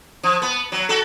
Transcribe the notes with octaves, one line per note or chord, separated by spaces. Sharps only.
F3
B3
F#3
F#4 A4